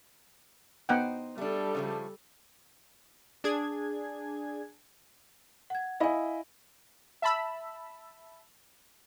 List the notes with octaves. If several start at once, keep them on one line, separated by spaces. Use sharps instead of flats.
B3 D#4 C5 F#5 G5
G3 A3 D4 A4
C#3 F3 A3
D4 G#4 G#6
F#5 G#6
E4 D#5 F5 G#5 B5
E5 A5 B5 E6